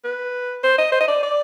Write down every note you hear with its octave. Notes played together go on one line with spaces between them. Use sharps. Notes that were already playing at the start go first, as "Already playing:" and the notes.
B4
C5
D#5
C5
D#5
D5
D5